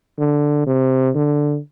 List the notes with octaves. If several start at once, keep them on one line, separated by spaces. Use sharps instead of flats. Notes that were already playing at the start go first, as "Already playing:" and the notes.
D3
C3
D3